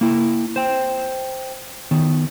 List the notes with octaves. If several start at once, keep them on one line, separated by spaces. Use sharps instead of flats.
A#3 E4
C5 G5
D#3 B3